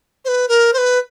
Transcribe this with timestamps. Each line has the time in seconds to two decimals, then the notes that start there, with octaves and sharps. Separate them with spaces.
0.25 C5
0.28 B4
0.48 A#4
0.73 C5
0.78 B4